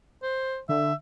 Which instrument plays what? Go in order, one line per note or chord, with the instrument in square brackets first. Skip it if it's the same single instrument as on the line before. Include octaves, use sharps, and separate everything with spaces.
[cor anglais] C5
[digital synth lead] D3 [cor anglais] E5